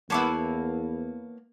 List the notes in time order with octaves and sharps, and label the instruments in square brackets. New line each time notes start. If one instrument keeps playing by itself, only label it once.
[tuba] E2 [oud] A#3 B3 E4 [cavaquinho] C#5 A5 D6